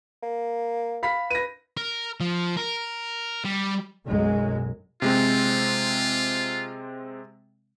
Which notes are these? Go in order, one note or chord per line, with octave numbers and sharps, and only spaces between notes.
A#3
F5 B5 B6
B4 A#6 D#7
A#4
F3
A#4
G3
B1 F#2 F#3 G#3
C3 G#3 C4 F4